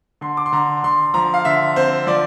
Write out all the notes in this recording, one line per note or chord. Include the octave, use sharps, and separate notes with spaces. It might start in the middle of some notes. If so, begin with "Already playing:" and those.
D3 C6
D6
C6
D3 A#5
D3 C6
F3 A#5
F5
D3 E5
C4 C5
F3 D5